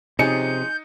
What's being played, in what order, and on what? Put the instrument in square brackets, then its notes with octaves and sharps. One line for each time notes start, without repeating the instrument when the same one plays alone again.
[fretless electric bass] C3 [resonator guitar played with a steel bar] F3 C#4 G#4 [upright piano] D#4 C#7 [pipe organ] G6